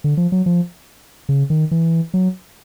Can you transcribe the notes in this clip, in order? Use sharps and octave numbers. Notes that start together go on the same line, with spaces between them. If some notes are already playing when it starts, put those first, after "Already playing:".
D3
F3
F#3
F3
C#3
D#3
E3
F#3